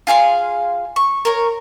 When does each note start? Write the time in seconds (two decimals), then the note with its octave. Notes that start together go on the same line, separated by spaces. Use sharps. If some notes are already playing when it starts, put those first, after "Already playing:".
0.07 F4 G#4 F5 C6
0.96 C#6
1.25 A#4 C#5